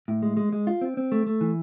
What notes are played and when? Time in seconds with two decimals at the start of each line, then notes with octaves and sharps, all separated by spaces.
0.08 A2
0.22 G#3
0.37 G#3
0.52 G#3
0.67 F4
0.81 C4
0.97 C4
1.12 A3
1.26 A3
1.41 E3